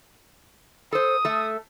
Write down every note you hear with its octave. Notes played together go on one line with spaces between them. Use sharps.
A4 C5 D#6
A3 A4